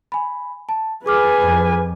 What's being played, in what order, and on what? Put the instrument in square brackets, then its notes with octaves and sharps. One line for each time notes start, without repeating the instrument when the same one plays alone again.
[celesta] G#5 B5
A5
[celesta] G#4 D6 F6 [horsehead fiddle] B4 G#5
[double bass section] F2